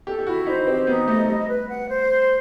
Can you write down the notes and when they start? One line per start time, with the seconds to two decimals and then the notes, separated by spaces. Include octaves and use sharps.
0.06 G4 A4
0.19 G4
0.26 E4 F#4
0.47 D#4 C5
0.67 C4 G4
0.87 B3 D#4
1.08 A3 D#5
1.28 G3 D#5
1.49 B4
1.69 F#5
1.88 C5
2.09 C6